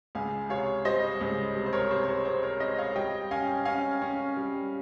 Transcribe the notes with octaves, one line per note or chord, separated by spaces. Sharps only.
C#2 F5 G#5
C3 C#5 F5
G3 C5 D#5
C#2
C3
C5
A#4 C#5
C3 C5
C#5
C5
C4 C5
A#4 C#5
C4 C5 D#5
C#5 F5
G3 D#5 G5
C#4 F5 G#5
C#4 F5 G#5
C#4
G3